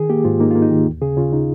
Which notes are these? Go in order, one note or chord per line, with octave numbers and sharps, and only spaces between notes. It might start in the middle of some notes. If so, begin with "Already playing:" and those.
Already playing: D#3 G#4
A#3 G4
G#2 F4
A#3 D#4
A#3 F4
D#4
D#3
D#2
C#3 G#4
C#3 F4
C#3 D#4